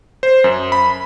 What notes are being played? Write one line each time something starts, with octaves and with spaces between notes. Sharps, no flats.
C5
F#2
B5